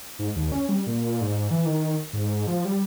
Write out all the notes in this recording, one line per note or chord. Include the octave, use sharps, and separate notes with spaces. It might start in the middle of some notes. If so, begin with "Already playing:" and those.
G#2
D#2
C#4
G3
A#2
G#2
G#2
E3
D#3
G#2
F3
G3